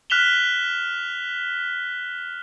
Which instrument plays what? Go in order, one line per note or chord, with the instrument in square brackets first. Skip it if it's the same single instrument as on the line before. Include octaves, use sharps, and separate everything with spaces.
[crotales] F6 F#6 B6 E7 F7 G7